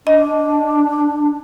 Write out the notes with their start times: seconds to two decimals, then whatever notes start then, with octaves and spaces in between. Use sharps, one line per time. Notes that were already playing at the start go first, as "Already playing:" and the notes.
0.07 D4 D#5